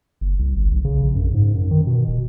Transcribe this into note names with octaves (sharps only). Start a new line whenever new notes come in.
F#1
C2
G1
B1
C#3
A#1
F#2
G#2
F#2
D#3
B2
D#1